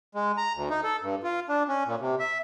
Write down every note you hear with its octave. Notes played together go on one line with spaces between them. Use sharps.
G#3
A#5
D2
D#4
A4
G2
F4
D4
C#4
A#2
C3
E5